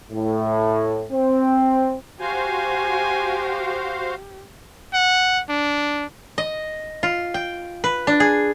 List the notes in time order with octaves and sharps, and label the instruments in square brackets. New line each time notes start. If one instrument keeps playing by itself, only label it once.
[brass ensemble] A2
C4
[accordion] F#4 C5 F5 [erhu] G4 [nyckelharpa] G#5
[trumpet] F#5
D4
[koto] D#5
F4
G5
B4
D4
G#4